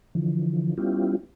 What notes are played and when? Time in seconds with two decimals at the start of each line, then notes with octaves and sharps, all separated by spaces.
0.15 D3 E3 F3
0.78 G3 B3 C#4 E4 F4 G4